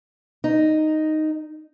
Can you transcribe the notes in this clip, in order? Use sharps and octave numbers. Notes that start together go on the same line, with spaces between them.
D#4